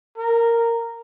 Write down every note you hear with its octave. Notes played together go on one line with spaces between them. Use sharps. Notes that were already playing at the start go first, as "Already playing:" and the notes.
A#4